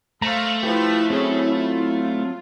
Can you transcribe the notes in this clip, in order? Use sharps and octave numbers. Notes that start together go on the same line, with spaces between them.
A3 C5 F5 A#5 C#6
F3 E4 G4 B4
F#3 C4 C#4 G#4
F4